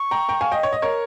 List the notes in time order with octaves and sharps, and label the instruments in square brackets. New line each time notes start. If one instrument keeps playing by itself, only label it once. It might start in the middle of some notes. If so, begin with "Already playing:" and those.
Already playing: [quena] C#6
[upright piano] G5 A#5
G5 A#5
F5 G#5
D#5 G5
C#5
D#5
A#4 C#5